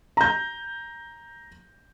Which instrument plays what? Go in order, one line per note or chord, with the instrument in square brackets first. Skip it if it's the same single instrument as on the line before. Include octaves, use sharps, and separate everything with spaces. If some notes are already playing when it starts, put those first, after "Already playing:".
[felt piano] A#5 G6